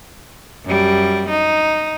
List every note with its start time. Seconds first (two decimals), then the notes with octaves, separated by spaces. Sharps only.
0.65 F#2 G3
1.29 D#4